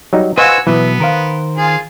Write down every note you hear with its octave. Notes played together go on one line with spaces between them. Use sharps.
F#3 G3 D#4
F#4 B4 C5 D#5 F5 G#5 E6
B2 E3 F#3 B3
D#3 A#4 C5 F5 A#5
F4 G#4